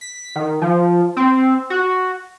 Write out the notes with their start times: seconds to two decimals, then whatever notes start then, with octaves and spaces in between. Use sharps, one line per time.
0.01 B6
0.36 D#3
0.62 F3
1.17 C4
1.70 F#4